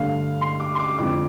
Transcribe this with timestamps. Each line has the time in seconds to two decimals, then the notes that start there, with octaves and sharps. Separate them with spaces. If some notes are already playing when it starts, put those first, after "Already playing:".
Already playing: G2 D3 A3 F5
0.41 C6
0.60 D6
0.75 C6
0.79 D6
0.98 F2 D3 F3 D6